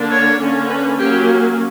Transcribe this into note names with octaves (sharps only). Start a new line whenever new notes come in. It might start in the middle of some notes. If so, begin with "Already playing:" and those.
Already playing: D3 A#3 D4
C#5
D3 A#3 C#4
B4
F#3 A#3 C#4 G4